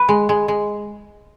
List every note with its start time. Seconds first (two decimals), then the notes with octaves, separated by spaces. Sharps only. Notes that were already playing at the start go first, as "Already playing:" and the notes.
Already playing: B4
0.09 G#3
0.29 G#3
0.48 G#3